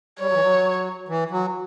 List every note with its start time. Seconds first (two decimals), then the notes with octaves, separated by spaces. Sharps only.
0.20 G3 C#5
0.28 F#3
0.34 E3
0.42 F#3
1.08 E3
1.31 F#3